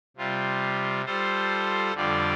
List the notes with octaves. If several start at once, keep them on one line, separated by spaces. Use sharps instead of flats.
C3 G3 F4
G3 F4 A4 C5
F2 D3 G3 F4 D5